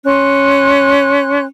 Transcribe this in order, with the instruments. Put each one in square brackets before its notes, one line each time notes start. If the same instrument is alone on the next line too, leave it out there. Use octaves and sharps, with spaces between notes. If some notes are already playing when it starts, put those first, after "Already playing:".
[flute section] C#4 C6 F#6